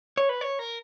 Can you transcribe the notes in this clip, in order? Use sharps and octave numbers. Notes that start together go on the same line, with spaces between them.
C#5
B4
C#5
A#4